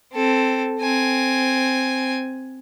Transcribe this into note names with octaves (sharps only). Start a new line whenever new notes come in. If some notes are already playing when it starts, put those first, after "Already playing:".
C4 A4
C4 G#5